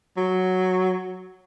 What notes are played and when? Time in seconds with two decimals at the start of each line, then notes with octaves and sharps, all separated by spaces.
0.17 F#3